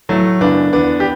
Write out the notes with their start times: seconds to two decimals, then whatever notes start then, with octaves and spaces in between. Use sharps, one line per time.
0.09 A2 E3 F#3 A3
0.41 F#2 C#3 E3 B3 D4
0.73 E2 D3 B3 D4
1.00 G4